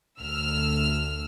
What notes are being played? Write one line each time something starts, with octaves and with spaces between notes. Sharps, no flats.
D2 E6 F6